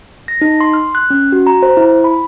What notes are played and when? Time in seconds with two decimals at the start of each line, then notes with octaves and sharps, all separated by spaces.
0.28 A#6
0.41 D#4
0.60 C6
0.73 F6
0.95 F#6
1.10 C#4
1.32 F#4
1.47 A#5
1.63 C5
1.77 E4
2.04 B5